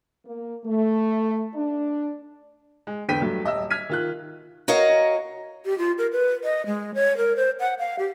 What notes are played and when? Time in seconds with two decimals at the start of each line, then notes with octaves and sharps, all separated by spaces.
0.25 A#3
0.65 A3
1.53 D4
2.87 G#3
3.09 E2 D3 B3 G5 B6 D#7
3.22 G2 F#3 A3
3.44 D#1 D#5 E5 E6
3.70 F6 G#6 B6 D#7
3.89 D#3 F4 F#6
4.68 F#4 A#4 C#5 D#5 F5 A#5
5.65 G4
5.78 F4
5.98 A#4
6.12 B4
6.44 D#5
6.66 G#3
6.95 C#5
7.17 A#4
7.36 C5
7.60 F#5
7.79 F5
7.99 G4